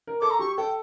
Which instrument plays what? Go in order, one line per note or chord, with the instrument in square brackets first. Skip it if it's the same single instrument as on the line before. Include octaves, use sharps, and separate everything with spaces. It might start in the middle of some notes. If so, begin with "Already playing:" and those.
[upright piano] A#4
[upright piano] A4 [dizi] D6
[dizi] A#5
[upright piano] G4 [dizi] C#6
[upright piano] A4 [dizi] G5